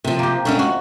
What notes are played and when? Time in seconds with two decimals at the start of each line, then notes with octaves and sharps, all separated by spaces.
0.04 C3 F3
0.19 A#3 G4
0.45 G#3 C#4 D4 F#4 E5
0.59 F2 F#4